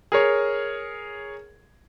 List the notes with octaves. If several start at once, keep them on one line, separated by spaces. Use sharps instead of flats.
G#4 A#4 C#5